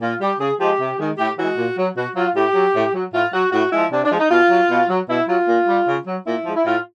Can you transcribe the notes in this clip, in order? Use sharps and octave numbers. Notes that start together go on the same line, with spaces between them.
A#2 F4
G3 G4
C#3 G#4
F3 G#3 G4
C3
D#3 G#3
A2 G4
E3 G#3 F#4
A#2
F#3
B2 F#4
F#3 F4
A2 G4
F#3
A2
F#3
A2 F4
F#3 F#4
A2 F#4
F3 G#3 E4
C3 D4
D4
F3 G#3
D#4
B2 F4
F#3
B2
F#3
B2 E4
F#3 F4
A#2
G3
C#3
F#3
A#2 E4
F3 G#3
E4
A2 F4